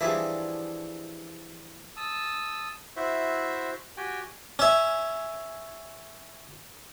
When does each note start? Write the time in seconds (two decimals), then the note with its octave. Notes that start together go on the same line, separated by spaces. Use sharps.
0.01 E3 F3 G3 D4 G#4 E5
1.97 A5 D#6 E6
2.96 E4 F#4 C5 E5
3.97 F#4 G4 G5 G#5
4.59 C#4 E5